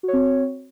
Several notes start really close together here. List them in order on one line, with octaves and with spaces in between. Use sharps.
F#4 C#5 C4